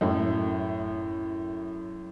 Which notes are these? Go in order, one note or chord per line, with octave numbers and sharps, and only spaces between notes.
F#2 A2